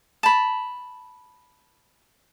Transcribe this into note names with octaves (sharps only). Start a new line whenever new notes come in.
A5 B5